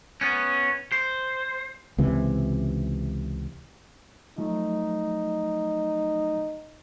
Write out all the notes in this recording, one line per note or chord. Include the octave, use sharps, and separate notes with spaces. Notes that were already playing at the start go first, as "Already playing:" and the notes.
B3 C#4
C5
C#2 C3 E3
F3 F#3 A3 D#4